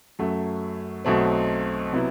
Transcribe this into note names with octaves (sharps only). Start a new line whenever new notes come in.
F#2 F#3 A3
B1 B2 F#3 A3 C4
C3 F#3 B3 E4